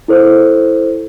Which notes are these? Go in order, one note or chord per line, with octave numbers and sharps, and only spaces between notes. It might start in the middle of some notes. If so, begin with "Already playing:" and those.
E4 A4 C5